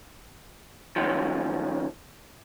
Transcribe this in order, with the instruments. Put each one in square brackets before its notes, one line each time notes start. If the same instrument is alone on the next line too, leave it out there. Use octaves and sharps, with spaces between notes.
[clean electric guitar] F#2 D#3 F3